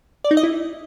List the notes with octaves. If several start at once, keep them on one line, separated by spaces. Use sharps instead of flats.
D5
D#4
D#5
E4